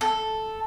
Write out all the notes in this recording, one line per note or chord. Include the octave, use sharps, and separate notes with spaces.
A4